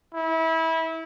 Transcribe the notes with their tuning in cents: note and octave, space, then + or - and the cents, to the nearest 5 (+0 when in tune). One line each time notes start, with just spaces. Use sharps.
E4 -25